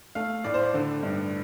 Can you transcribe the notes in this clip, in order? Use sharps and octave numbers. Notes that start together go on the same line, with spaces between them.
A3 F5
A2 D5
C5
D5
D3
G2